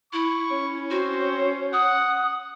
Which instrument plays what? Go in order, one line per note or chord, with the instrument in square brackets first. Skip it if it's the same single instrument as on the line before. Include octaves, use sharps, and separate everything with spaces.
[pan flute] E4 [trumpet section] C#6
[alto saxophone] C#4
[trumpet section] C4 C5 [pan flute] F#4
[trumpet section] F#5 [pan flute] D#6